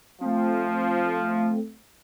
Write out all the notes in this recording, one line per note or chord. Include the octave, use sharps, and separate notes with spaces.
F3 A3 C4